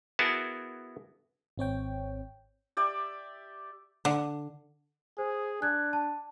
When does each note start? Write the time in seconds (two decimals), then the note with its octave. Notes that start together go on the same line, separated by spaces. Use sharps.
0.19 B3 E4 F#4 G#4 A#4 A5
1.58 G#1 C4 C#5 G5
2.77 G4 D5 E5
4.05 D3
5.18 G#4 C5
5.62 D4 F#6 G#6
5.93 A5